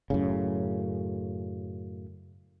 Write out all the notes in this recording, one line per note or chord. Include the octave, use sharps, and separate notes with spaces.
F#2 A2 C#3